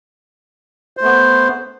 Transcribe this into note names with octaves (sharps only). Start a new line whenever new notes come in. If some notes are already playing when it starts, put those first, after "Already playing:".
A3 B3 C5